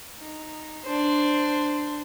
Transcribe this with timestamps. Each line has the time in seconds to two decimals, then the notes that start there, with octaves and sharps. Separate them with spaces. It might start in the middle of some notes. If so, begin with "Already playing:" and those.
0.19 D#4
0.84 D4 C5